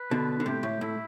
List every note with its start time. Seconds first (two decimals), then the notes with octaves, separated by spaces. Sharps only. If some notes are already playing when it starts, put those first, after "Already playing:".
Already playing: B4
0.11 B2 D3
0.40 D3
0.46 A2 C3 G4
0.63 A2
0.81 A2 E4